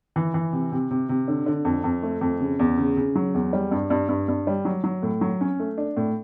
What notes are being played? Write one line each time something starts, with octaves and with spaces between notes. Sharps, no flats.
E3
E3
C3
C3
C3
C3
D3
D3
F2
F2
A3
F2
C#3
E2
C#3
C#3
F#3
E2
G3
G2
G2
G2
G2
G3
F#3
F#3
A2
F#3
C#4
A3
D4
A2